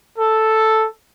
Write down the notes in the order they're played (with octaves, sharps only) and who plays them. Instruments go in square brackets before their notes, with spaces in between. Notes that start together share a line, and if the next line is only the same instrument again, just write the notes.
[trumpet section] A4